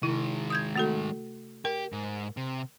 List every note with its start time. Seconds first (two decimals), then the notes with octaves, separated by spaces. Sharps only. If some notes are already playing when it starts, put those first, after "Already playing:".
0.03 C3 D#3 G#3 E4
0.50 D#6 G6 G#6
0.76 A3 F#4 A4
1.65 G4 A#4
1.92 G#2
2.37 C3